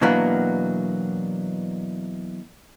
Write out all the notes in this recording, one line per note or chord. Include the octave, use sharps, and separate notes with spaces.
B2 E3 F#3 A#3 B3 D4